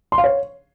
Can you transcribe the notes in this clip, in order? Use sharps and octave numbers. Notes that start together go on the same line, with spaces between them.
C6
F5
C#5